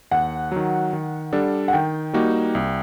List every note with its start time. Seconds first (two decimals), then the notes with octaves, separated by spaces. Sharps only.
0.11 D#2 F#5
0.52 D#3 F#3
0.93 D#3
1.33 G3 D4 A4
1.68 F#5
1.73 D#3 G5
2.13 G3 A#3 D#4 F#4
2.55 C2